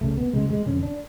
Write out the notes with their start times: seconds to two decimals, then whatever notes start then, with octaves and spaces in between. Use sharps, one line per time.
0.01 C#2 C#3 A3
0.18 B3
0.33 D2 C#3 G#3
0.50 G#3
0.66 F2 D3 C#4
0.83 D4